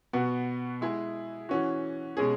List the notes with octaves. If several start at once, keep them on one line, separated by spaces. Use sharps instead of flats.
B2 B3 F#4
G#3 E4 G#4
E3 C#4 F#4
B2 G#3 C#4 G#4